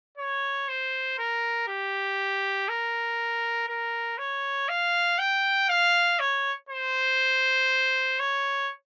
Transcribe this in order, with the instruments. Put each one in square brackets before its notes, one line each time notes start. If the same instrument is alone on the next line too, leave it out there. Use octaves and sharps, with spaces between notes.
[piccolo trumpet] C#5
C5
A#4
G4
A#4
A#4
C#5
F5
G5
F5
C#5
C5
C#5